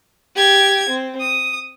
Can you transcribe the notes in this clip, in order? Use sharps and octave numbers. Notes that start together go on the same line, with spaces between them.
G4 G#6
C4
D#6